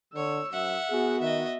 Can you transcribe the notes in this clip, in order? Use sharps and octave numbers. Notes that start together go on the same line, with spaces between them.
D3 C#5 E6
F#2 E5 F#5
B3 F#4 G#4
D#3 D#5 E5